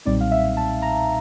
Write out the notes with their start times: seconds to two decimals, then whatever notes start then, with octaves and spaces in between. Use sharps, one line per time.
0.05 B1 A#2 G3 C4 D#4 D5
0.21 F5
0.31 E5
0.57 A5
0.82 A#5